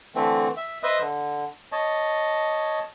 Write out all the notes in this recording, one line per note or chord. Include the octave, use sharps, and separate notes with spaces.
D3 E3 A3 C4
E5
B4 C5 D#5 E5 D#6
D3
C#5 D#5 A5